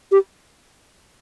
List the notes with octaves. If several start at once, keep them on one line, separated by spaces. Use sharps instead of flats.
G4